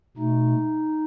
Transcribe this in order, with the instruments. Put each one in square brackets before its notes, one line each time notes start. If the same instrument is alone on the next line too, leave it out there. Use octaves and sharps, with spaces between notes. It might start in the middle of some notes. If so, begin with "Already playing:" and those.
[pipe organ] B2 A3 D#4